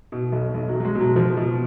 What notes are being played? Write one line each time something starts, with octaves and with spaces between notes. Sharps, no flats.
B2
B1
B1
F#3
B1
F#3
G#3
B2
F#3
B2 F3
B2